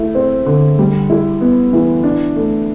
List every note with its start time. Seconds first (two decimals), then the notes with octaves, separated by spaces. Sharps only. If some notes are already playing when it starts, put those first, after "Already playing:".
Already playing: A3 E4
0.15 C4
0.46 D3
0.79 G3
1.10 E4
1.41 B3
1.73 E3
2.03 D4
2.36 A3